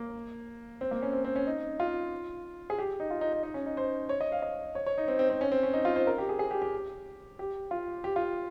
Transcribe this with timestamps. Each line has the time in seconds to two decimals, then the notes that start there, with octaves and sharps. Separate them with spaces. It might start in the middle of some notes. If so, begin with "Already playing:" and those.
Already playing: A#3
0.81 C4
0.91 A#3
1.02 C#4
1.13 C4
1.24 C4
1.36 C#4
1.47 D#4
1.80 F4
2.70 G#4
2.78 G4
3.00 D#4
3.10 F4
3.21 D#4
3.33 D#4
3.43 D#4
3.54 C#4
3.66 D#4
3.77 C5
4.09 C#5
4.21 D#5
4.32 F5
4.42 D#5
4.75 C#5
4.86 C#5
4.98 D#4
5.08 C4
5.19 C4
5.30 C4
5.41 C#4
5.52 C4
5.63 C#4
5.73 D#4
5.85 F4
5.96 C5
6.07 A#4
6.18 G4
6.29 G#4
6.39 G#4
6.51 G4
6.62 G4
7.39 G4
7.71 F4
8.04 G4
8.16 F4